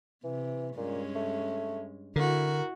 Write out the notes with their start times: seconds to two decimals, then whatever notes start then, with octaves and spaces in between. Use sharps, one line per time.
0.24 C3 E3
0.77 G2 A#2 G#3 C#4
1.15 A3
2.16 D3 E4 F#4 A#4